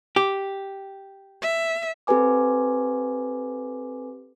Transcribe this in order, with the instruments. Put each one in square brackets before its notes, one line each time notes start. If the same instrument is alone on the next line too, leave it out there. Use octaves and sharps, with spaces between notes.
[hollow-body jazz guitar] G4
[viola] E5
[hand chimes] C4 G4 A4 B4 G#5 D6